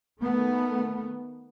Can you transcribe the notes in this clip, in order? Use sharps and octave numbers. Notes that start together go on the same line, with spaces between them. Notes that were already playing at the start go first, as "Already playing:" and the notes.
D#3 A3 B3